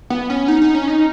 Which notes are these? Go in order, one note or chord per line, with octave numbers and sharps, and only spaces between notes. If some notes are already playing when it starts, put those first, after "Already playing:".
B3
C#4
D#4
D#4
C#4
D#4